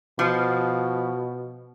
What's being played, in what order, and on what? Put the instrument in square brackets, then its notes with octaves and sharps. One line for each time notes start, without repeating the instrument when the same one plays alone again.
[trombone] B2 [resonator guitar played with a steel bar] F3